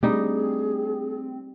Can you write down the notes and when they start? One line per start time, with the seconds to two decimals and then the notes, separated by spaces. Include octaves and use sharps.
0.03 G3 A3 C4 D4 D#4 G#4